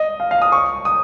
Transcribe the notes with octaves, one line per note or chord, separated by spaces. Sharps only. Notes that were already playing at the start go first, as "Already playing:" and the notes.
Already playing: D#5
F5
F5
D#6
C#6
D#6